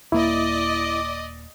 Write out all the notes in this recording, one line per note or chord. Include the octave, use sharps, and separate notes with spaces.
D#1 A#3 E4 D5 D#5 D6